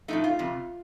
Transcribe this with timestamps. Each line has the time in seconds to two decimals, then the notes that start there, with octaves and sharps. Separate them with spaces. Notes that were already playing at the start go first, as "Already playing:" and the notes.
0.08 A2 F3 A3 D#4
0.24 F4
0.39 F2 C3